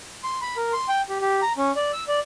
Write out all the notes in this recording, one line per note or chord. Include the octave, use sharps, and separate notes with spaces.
C6
B5
A#4
C6
G5
G4
G4
A#5
C#4
D5
E6
D5